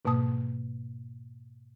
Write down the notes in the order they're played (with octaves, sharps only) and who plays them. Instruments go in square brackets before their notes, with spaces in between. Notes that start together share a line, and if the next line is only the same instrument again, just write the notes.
[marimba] G#2 B2 A#3 A5 D#6